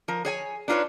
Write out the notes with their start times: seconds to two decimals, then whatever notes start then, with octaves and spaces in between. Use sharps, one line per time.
0.08 F3 A#4
0.25 G#4 C#5 G#5
0.68 D4 D#4 F4 G#4 B4 C#5